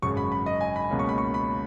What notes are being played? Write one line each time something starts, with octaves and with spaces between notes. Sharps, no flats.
G#1 F#2 C#3 C#6
B5
B5
D#5
G#5
B5
C#2 B2 A#3 C#4
C#6
B5
C#6
B5